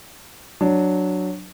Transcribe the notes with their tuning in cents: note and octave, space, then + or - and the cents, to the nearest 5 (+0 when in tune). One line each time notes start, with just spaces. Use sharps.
F#3 +0 D4 +5